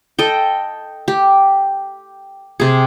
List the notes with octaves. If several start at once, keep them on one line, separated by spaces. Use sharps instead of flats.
A4 D#5 G5
G4
C3 G#4